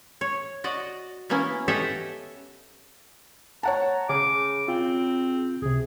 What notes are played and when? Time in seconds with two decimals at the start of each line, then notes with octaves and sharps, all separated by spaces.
0.21 C#5
0.64 F#4 D5 D#5
1.29 E3 A#3 B3 C#4 E4
1.68 G4 A4 C#5 D#5 E5 F#5
3.63 C#5 F#5 A5 A#5
4.09 C#3 G#4 D6
4.68 C4 F4
5.62 C#2 C3 G#4